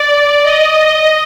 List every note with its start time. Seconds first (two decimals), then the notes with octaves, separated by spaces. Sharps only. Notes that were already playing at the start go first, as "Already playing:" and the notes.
Already playing: D5
0.43 D#5